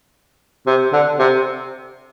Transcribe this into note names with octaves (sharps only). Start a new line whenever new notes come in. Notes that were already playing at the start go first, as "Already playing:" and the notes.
C3
D3
C3